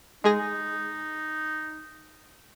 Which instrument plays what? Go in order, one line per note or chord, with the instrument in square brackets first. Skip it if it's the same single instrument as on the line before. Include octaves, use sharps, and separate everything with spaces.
[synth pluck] G#3 G#4 A#6 [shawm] D#4